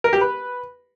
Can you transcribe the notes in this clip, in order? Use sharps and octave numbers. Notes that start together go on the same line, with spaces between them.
A#4
G4
B4